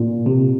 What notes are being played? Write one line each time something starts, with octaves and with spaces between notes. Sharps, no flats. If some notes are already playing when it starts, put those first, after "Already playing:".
Already playing: A#2
C3